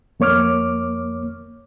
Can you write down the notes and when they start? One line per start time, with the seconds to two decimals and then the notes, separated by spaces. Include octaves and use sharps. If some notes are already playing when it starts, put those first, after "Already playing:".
0.20 F2 A#3 C#5 D6 F6